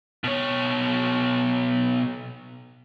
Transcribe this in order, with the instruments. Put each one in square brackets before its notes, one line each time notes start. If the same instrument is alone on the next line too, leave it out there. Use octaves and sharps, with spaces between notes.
[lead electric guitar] B2 C#5